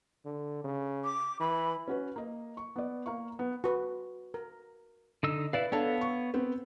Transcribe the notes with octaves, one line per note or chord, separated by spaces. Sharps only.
D3
C#3
D6
E3 B5
C#4 F#4 B4
A#3 D#5
C#6
B3 D5
A#3 F5 C#6
B3
F#4 B4
A#4
D3 D#4 E6
E4 B4 D5 F5
B3 D4 A4 C#5 F5 A5
C#6
B3 C4